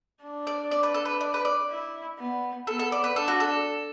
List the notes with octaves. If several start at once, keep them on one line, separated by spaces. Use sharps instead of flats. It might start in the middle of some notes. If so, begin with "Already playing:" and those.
D4
D5
D5
B4
A4
B4
D5
B4
D5
E4
B3
B3 A4
A4
D5
B4
D4 A4
F#4
A4